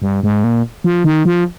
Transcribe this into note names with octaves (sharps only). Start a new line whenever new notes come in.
G2
G#2
A#2
F3
D#3
F3